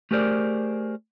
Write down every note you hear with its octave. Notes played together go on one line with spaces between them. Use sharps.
A3 G4 G#4 A#4 C5 D5